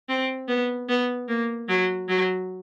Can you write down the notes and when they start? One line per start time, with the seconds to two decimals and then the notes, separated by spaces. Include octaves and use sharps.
0.09 C4
0.48 B3
0.89 B3
1.28 A#3
1.68 F#3
2.09 F#3